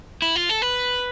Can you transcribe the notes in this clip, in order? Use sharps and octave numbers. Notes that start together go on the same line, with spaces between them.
E4
F4
A4
B4